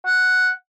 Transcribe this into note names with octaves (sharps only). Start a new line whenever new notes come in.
F#5